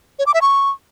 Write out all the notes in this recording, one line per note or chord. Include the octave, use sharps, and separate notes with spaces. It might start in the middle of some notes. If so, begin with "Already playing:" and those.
C#5
D6
E5
C#6